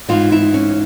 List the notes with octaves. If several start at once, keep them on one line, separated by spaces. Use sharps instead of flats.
G#2 E3 F4
E4
C#4